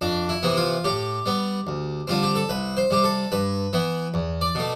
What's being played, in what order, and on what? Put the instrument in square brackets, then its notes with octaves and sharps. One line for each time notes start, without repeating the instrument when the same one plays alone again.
[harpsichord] F2 D4
E4
C3 E3 B3
F4
A2 G4
G3 B3
D2
D3 G3 C4 F4
G4
A4
C2 B4
C5
C3 G3 G4
A4
G2 B4
E3 B3
E2
D5
B2 A3